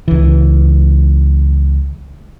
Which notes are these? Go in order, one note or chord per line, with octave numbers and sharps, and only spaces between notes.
C#2 E3